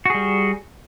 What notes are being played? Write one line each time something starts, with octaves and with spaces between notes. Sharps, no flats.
G3 F#4 G#4